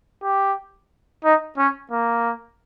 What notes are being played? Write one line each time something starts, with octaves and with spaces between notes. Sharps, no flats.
G4
D#4
C#4
A#3